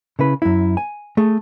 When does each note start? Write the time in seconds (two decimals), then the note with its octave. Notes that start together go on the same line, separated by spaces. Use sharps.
0.19 C#3 E4 B4
0.42 F#2 E4
0.77 G#5
1.17 A3 G#4